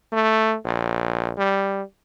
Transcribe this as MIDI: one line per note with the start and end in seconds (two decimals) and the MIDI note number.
0.13 0.56 57
0.65 1.32 34
1.38 1.83 55